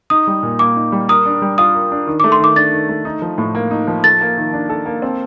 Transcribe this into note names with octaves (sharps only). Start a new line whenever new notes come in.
D#4 D#6
G3
A#2
A#3 D6
D#4
G3
A#4 D#6
D4
G3
F4 D#6
A#4
D4
D#3
A3 D6
C6
D#3 D6
D4 A6
D#3
A3
D#4
F3
A2
A#3
D#4
F3
A4 A6
A#3
D#3
D4
A4
A#3
C4